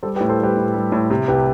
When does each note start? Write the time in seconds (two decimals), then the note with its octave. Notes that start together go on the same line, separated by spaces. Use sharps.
0.03 G3 A4 C5
0.16 G4 B4
0.21 A2
0.29 A4 C5
0.39 G3 G4 B4
0.57 A2
0.74 G3
0.92 A2
1.10 C3
1.28 C2 G4 B4